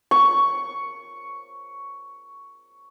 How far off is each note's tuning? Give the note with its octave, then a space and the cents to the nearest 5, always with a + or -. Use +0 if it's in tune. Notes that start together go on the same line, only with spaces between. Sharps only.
C#6 +5